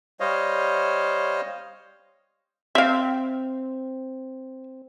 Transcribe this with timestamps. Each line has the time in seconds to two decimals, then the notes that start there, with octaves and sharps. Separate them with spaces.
0.20 G3 C5 C#5 D#5 F5
2.75 C4 E5 F5